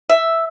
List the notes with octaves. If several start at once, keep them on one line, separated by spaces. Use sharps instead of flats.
E5